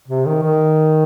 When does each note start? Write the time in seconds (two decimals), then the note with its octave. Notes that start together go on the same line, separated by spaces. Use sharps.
0.08 C3
0.26 D#3
0.43 D#3